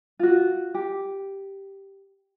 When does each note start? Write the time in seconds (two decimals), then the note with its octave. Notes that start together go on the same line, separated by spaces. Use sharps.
0.19 F4 F#4
0.75 G4